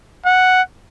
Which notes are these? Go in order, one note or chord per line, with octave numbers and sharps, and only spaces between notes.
F#5